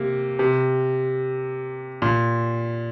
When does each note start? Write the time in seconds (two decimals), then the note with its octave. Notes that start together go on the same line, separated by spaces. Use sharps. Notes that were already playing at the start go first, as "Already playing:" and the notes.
Already playing: C3 A#3
0.39 C3
2.02 A#2